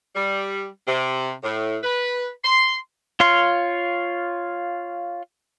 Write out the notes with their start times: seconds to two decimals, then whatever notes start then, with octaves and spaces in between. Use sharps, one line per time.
0.16 G3
0.87 C3
1.43 A2
1.84 B4
2.44 C6
3.20 F4 C#5 F5 C6